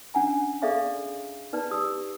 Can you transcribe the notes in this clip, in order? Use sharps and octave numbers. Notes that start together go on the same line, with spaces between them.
C#4 D4 F#5 G#5 A#5
G#4 A4 D5 E5 F5 C#6
D#4 B4 D5 A5
G4 D#6 E6